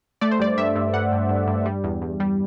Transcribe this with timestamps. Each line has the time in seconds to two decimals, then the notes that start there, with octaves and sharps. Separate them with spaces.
0.21 A3 D5
0.31 C5
0.39 G2 D5
0.58 G2 E5
0.76 G2
0.93 G2 F#5
1.12 G2
1.29 G2
1.47 G2
1.66 G3
1.84 E2
2.02 E2
2.20 G3